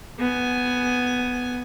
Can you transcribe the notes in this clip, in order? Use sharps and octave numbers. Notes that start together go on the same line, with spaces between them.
B3 G#5